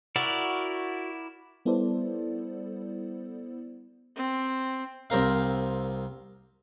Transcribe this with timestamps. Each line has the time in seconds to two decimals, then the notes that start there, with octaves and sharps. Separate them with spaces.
0.16 E4 F#4 A#4 D5
1.65 G3 B3 E4 A4 C5 D5
4.16 C4
5.10 C2 C4 A#4 F5